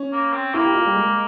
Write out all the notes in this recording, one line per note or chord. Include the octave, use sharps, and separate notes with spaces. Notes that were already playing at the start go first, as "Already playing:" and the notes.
Already playing: C#4
A#3
C4
A#3 E4
G4
F4
G3
G#3